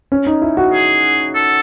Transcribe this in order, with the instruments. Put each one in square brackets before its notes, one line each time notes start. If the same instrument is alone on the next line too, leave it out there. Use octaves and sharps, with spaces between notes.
[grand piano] C#4
D#4
E4
F#4
[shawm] G#4
A4